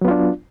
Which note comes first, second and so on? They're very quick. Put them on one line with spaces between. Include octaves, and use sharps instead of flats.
F#3 B3 F4 D4